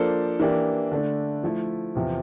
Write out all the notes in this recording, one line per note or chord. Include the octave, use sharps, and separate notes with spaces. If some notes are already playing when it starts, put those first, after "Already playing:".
Already playing: F3 A#3 D4 A4 C5
E3 A#3 D4 G4
D3 A3 D4
F3 A3 E4
E2 C3 F3